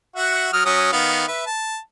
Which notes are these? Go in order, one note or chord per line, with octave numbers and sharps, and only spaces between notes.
F#4 E5 F#5
F#3 D#6 F6
F#3 C#4 D#6
D#3 B3 F5
B4 E5
A5